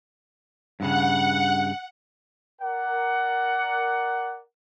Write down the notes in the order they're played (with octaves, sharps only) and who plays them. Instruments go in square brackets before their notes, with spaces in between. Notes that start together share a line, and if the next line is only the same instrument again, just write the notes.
[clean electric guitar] G2 A#2 C#3 [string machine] F#5
[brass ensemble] A#4 D5 F#5